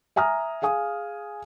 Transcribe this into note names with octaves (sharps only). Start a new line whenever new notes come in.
E5 G#5 A#5 D#6 F6
G#4 F5 G#5 D#6